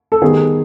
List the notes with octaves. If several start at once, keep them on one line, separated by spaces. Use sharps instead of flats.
A4
D#3 G3 B3 D#4 G#4